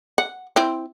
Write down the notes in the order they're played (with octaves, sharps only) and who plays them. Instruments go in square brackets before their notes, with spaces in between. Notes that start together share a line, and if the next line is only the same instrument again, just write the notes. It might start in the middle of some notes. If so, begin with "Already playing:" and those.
[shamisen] F#5
C4 E4